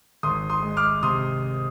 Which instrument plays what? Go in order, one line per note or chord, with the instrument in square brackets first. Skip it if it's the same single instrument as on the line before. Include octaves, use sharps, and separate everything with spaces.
[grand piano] G#1 C6 D#6
C6 D#6
G#3
D6 F6
C3 C6 D#6